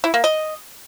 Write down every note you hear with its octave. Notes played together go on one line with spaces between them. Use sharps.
E4
A#3
D#5